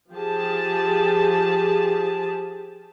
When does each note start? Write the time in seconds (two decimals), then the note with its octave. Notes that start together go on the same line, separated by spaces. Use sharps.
0.13 F3 G4 G#4 A5